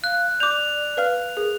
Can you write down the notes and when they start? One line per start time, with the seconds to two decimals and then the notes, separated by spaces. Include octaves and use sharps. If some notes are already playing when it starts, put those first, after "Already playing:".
0.04 F5 F#6
0.40 D5 D6 G6 F7
0.97 B4 F5 F6
1.37 G#4 A#4